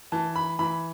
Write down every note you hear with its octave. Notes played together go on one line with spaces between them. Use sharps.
E3 A5
B5
E3 B5